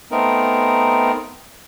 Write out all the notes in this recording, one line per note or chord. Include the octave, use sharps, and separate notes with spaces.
A3 B3 C4 D#4 A#4